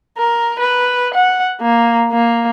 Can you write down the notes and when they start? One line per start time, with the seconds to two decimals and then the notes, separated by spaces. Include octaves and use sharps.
0.18 A#4
0.59 B4
1.14 F#5
1.61 A#3
2.12 A#3